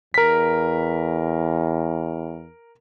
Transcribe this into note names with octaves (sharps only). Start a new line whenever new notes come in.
E2 A#4 B6